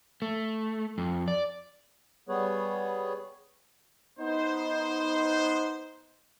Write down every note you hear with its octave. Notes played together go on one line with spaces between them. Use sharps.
A3
F2
D5
G3 B3 G#4 B4 C#5
B3 D#4 C5